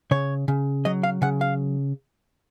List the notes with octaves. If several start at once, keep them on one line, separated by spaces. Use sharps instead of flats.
C#3 C#5
C#3
F#3 D#5
F5
C#3 F#5
F5